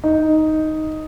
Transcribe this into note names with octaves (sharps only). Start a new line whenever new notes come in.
D#4